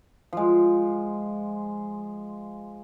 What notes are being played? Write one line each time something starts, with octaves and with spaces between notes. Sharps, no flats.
F3 G#3